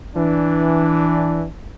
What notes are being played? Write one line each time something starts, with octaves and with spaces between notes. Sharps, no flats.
E3 D4